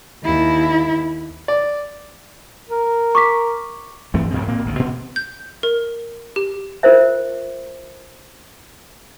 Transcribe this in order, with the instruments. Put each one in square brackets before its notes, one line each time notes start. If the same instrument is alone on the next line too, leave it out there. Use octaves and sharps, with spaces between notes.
[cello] D#2 E4
[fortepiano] D5
[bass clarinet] A#4
[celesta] C#6 D6 B6
[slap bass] G2 E3 A3 C4
A1 F#2 B2 C4
A2 A#3 C4
G#1 D2 D#3
B2 B3 C4
[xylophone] G6
A#4
G4
[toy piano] F4 A#4 C5 E5